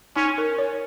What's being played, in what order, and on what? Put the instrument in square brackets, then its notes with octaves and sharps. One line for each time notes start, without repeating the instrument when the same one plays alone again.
[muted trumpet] C#4 [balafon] D#4
[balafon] A#4
C#5